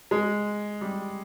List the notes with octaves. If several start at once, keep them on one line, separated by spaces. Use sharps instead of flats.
G#3
G3